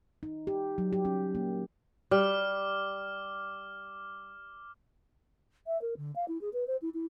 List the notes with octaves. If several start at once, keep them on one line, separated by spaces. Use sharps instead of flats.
D#4
G4
F#3
G4
C#4
A#3
G3 D6 F6
E5
A#4
D3
F5
E4
G#4
B4
C5
E4
E4